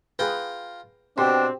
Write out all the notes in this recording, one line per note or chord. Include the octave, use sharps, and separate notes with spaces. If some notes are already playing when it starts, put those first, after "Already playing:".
F4 G#4 B4 G5 A#5
B2 C4 D4 G4 C6